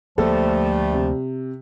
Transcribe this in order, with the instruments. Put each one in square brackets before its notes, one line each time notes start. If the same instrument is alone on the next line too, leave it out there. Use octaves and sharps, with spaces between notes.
[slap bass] D2 A#3 [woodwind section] F3 A3 [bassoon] G3 [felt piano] A4
[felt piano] C3